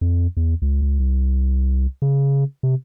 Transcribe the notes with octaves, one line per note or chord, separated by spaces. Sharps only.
F2
E2
C#2
C#2
C2
C#3
C3